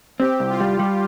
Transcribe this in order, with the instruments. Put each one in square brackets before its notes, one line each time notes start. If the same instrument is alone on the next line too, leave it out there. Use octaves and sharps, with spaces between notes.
[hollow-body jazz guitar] C4 [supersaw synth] G4
[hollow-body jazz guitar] C2
[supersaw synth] F4
[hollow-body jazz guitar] G3
G3